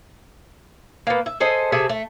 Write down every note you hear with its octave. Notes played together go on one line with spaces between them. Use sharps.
A#3 B3
E5
G#4 A4 C5 D#5
C3 G#4 A4 E5
A3